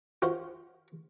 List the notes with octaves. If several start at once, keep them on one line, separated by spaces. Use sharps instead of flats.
F4 F#4 C5